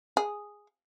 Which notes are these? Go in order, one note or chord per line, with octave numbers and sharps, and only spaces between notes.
G#4